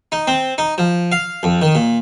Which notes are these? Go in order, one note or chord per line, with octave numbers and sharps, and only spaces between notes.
D#4
C4
D#4
F3
F5
F2
D#3
A#2